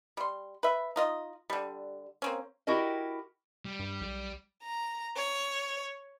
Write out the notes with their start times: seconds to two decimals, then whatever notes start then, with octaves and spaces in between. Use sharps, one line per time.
0.17 G3 C6
0.63 B4 E5
0.96 D#4 F4 D#5
1.50 D3 G3
2.22 A#3 C4 C#4
2.67 E4 F#4 G4 A#4 D#5
3.65 G3
3.79 G2
4.01 B1
4.63 A#5
5.16 C#5